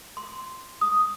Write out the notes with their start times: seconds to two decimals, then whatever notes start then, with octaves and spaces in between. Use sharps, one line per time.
0.17 C6
0.81 D#6